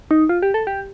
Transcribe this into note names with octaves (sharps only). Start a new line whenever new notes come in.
D#4
F4
G4
A4
G4